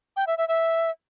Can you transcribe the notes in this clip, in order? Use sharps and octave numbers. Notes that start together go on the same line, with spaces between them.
G5
E5
E5
E5